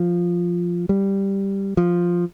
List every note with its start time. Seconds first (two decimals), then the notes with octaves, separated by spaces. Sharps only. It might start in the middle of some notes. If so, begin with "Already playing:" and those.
Already playing: F3
0.89 G3
1.77 F3